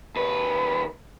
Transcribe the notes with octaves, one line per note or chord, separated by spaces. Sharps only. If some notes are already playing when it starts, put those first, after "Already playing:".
D#2 B4